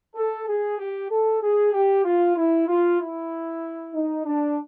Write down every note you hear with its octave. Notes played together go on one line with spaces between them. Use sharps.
A4
G#4
G4
A4
G#4
G4
F4
E4
F4
E4
D#4
D4